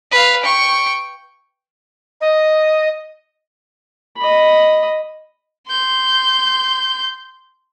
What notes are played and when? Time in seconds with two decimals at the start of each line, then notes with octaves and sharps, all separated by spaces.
0.12 B4 F5
0.43 G5 C#6
2.21 D#5
4.17 D#5 B5
5.68 C6 G6